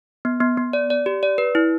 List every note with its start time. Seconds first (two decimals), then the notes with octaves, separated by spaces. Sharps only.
0.25 B3
0.40 B3
0.57 B3
0.73 D5
0.90 D5
1.06 G4
1.23 D5
1.38 B4
1.55 E4